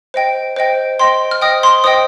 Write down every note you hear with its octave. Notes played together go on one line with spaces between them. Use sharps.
C5 D#5 G5
C5 D#5 G5
C5 D#5 G5 C6
F6
C5 D#5 G5 D#6
C6
C5 D#5 G5 D#6